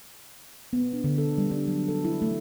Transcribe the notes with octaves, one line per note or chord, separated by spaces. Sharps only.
B3
D4
D3
A4
G3
D4
F#3
A4
E4
A3